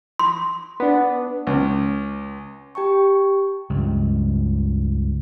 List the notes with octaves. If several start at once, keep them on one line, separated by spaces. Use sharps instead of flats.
C6
B3 D4
C#2
G4 G5 A5 C#6
C#2 G2